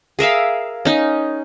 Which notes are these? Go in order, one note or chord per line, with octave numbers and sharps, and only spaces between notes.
G#4 A#4 E5 F5
C#4 D#4